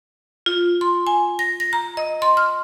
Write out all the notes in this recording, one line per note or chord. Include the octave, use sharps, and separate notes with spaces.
F4
C6
G#5
A#6
A#6
A#5
D#5
C6
F6